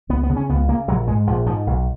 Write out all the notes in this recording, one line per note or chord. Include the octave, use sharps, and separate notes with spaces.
C#2 B3
B3
C#3
C#4
C#2 B3
C#3 A#3
A#1 F#3
G#2 G#3
A#1 F3
G#2 F3
B1